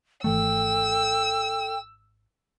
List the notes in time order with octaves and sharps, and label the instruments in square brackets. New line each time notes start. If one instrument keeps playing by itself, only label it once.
[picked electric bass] G#1 E3 A3 [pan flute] A4 [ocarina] G5 [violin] E6